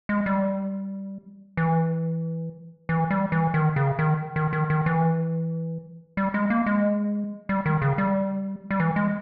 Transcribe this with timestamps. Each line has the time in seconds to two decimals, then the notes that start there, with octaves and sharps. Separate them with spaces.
0.09 G#3
0.26 G3
1.57 E3
2.89 E3
3.11 G3
3.32 E3
3.54 D#3
3.76 C#3
3.99 D#3
4.36 D#3
4.53 D#3
4.70 D#3
4.86 E3
6.17 G3
6.34 G#3
6.50 A#3
6.66 G#3
7.49 G3
7.66 D#3
7.82 C#3
7.98 G3
8.71 G3
8.80 E3
8.96 G#3